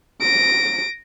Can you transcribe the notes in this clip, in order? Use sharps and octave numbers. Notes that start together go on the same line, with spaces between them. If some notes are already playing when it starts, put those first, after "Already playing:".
A#6 D7